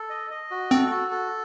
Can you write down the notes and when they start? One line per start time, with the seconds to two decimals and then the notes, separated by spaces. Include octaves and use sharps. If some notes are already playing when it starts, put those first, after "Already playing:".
Already playing: A4
0.10 D#5
0.30 D#5
0.51 F#4
0.71 C4 A4
0.91 F#4
1.11 A4